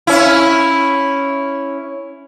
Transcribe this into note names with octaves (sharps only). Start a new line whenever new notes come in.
C#4 E4